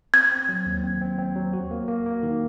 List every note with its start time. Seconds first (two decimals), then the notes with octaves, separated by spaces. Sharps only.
0.14 C4 G#6
0.31 C4
0.49 F#3
0.66 D#2
0.84 C4
1.01 C4
1.18 C4
1.36 F#3
1.53 F#4
1.71 A#3
1.88 A#3
2.06 A#3
2.23 D#3